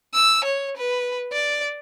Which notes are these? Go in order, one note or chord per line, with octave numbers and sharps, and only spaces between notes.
E6
C#5
B4
D5